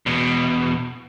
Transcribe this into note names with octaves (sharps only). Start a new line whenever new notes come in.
E2 B2